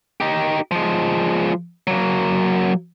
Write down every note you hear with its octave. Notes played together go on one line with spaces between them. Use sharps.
D#4 G4
F3 G#3
F#3 A#3